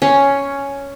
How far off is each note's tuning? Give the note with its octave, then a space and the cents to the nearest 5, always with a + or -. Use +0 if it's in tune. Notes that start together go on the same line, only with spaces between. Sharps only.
C#4 +5 C6 +0